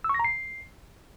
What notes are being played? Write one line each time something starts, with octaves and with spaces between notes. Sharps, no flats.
E6
C#6
A#6
A#5
C7